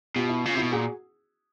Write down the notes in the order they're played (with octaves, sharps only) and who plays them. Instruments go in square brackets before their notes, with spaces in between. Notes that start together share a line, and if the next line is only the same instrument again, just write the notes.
[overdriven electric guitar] B2 [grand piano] F4 G4
[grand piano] E4
[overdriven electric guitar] C#3 [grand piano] F4
[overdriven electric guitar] C3 [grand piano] E4 F#4
[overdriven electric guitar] B2
[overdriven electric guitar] A#2 [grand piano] F#4 G#4